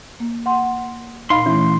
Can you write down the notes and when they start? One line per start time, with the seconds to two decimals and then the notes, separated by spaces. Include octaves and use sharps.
0.20 A#3
0.46 F#5 C6
1.30 A#2 D#4 F5 B5 C6
1.46 E3 A3 C#4 E4